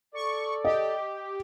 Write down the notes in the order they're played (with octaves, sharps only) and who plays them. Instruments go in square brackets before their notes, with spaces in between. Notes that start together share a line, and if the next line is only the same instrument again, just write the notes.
[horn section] A4 D5 [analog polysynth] C#6
[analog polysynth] G4 [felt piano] D#5